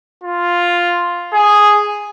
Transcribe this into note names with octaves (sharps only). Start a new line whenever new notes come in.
F4
G#4